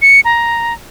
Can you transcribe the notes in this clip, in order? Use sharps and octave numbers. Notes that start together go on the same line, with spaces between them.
C#7
A#5